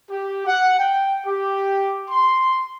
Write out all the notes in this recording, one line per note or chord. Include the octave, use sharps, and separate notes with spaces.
G4
F#5
G5
G4
C6